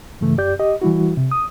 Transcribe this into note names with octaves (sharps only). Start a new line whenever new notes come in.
G2 C#3 E3 A3
F#2 G4 D5 G6
G4 D#5
E3 G3 E4 F#4
C3
D#6